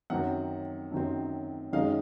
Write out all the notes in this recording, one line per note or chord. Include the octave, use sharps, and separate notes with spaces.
F#2 D#3 F#3 C4 F#5
F#2 D#3 F#3 C4
F#2 D#3 G#3 D#4 F5